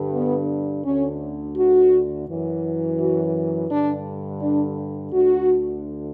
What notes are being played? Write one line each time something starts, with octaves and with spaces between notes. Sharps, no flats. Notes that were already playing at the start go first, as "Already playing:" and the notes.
Already playing: G2 D3
B3
D2 D3 C#4
F#4
F#2 E3
F#4
G2 D3 D4
D4
D2 D3 F#4